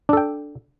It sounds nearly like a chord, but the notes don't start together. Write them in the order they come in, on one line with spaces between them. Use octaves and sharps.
D4 A4 G5